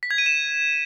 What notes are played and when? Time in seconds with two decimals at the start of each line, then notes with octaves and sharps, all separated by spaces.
0.03 B6
0.11 G#6
0.18 D#7
0.26 E7